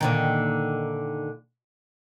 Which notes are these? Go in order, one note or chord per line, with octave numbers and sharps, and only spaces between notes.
A#2 D3 D#3